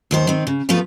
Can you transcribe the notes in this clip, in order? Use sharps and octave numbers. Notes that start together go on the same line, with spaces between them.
D#2 D#3 C5
D#3 C4
C#3
F3 A3 B3 F4 B4